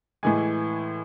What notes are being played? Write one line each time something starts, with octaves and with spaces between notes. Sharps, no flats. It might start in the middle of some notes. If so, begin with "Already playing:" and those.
A2 E3 G#3 G#5